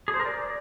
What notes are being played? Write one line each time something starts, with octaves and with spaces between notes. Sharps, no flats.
G#4
C5
A#4
D5